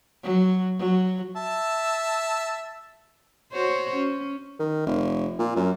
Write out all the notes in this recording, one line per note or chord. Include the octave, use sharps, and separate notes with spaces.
F#3
F#3
E5 A5
F#4 C5 C#5
C#4
D#3
F1
A#2
F#2